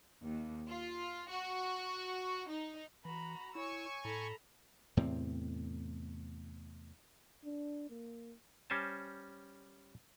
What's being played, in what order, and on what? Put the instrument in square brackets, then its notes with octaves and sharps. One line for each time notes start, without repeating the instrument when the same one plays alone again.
[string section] D#2
F4
F#4
D#4
[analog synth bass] E3 [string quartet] F#4 A#5 [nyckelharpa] B5
[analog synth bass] E4 [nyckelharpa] C#5 [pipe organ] G#5 C#6 [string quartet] E6
[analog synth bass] A2 [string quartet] A4 B5 [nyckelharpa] A#5
[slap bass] E2 A2 C3 C4
[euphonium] D4
A#3
[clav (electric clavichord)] G3 C#4 C5 G#5 A5